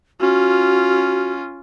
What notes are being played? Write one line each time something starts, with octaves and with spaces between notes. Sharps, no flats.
C#4 F4 F#4